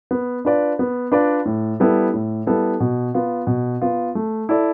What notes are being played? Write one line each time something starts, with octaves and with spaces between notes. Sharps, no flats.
B3
D4 F4 B4 D5
B3
D4 F4 B4 D5
A2
G3 B3 E4 A4
A2
G3 B3 E4 A4
B2
B3 F4
B2
B3 F4
A3
E4 A4 D5